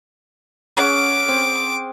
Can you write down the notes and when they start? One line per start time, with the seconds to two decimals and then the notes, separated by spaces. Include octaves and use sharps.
0.77 C#4 G#4 F#5 D6
1.29 C4